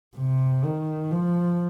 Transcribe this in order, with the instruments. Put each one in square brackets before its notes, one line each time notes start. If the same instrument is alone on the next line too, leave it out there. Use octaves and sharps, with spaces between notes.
[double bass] C3
D#3
F3